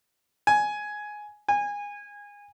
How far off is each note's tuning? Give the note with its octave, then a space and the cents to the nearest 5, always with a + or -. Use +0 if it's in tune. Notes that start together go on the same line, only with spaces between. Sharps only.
G#5 +10
G#5 -20